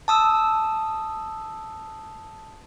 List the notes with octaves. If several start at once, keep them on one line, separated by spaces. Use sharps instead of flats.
A5 D#6 E6